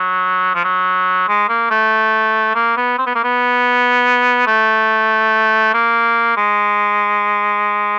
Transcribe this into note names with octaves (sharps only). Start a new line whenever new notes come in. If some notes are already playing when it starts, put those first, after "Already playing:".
Already playing: F#3
F3
F#3
G#3
A#3
A3
A#3
B3
C4
B3
A#3
B3
A3
A#3
G#3